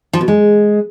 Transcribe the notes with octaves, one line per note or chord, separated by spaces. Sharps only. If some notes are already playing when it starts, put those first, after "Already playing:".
F3
B2
G#3